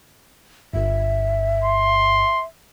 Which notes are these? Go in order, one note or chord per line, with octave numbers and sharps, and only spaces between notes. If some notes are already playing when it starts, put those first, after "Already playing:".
G1 G2 E5
C6